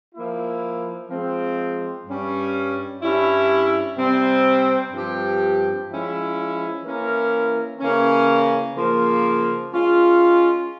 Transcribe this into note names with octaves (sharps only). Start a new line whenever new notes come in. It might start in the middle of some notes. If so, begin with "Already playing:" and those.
F3 A#3 E4
F3 G#3 C4
G2 G3 C#4
G2 G3 C#4 E4
C3 G3 C4
G2 F3 C4 G4
F3 G#3 C#4 E4
E3 A#3 C#4 E4 A#4
C#3 E3 A#3 C#4
C#3 F3 A#3
G#3 C#4 F4